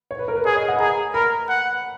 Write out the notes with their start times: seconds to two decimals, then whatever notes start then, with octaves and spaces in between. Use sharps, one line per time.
0.11 C#5
0.19 B4
0.28 A#4
0.37 B4
0.45 G#4 C#5
0.56 D#5
0.68 F#5
0.76 B5
0.80 G#4 A#5
1.14 A#4 B5
1.49 F#5